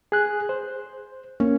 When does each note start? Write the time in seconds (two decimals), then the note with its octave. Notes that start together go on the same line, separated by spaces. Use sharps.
0.12 G#4 F#6
0.49 C5
1.40 A#3 C#4